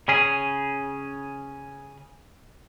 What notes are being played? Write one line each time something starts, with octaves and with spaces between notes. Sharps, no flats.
C#3 C#4 G#4